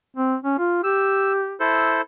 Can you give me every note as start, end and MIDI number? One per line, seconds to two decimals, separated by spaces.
0.16 0.36 60
0.44 0.59 61
0.59 0.82 65
0.84 1.57 67
0.84 1.32 88
1.60 2.01 64
1.60 2.01 69
1.60 2.01 72